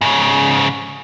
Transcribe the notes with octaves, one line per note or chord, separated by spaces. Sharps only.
G#2 C#3